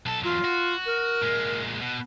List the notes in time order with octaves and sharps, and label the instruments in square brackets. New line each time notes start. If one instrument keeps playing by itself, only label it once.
[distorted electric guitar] B1 A4 [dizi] A5
[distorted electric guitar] E2 F#3 [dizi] F4
[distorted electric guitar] F#4
[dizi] A#4
[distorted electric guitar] A#2 G#3
B2